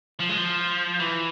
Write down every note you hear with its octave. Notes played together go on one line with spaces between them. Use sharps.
F3
G#3
F3
E3